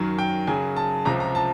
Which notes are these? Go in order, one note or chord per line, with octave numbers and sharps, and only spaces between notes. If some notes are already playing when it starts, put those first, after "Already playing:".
Already playing: F#2 D#3 F#3
G5
F#2 C#3 F#3 G#5
A5
C#2 C3 F3 A#5
A#5
A5